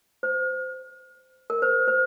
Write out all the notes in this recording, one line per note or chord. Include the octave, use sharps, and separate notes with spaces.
C5
A#4
C5
C5